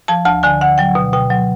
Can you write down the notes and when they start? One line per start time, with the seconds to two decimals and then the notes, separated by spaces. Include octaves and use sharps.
0.08 F3 A5
0.25 D2 A5
0.43 D3 G#5
0.61 D3 F#5
0.78 F#3 G5
0.95 B2
1.13 B2 G5
1.30 F#3